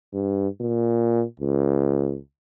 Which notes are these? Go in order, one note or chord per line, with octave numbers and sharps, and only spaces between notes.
G2
A#2
C#2